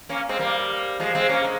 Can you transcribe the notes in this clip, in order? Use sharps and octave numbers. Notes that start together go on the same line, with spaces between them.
A#3 C#4
G#3 C4
G3 A#3
F3 G#3
G#3 C4
A#3 C#4
G#3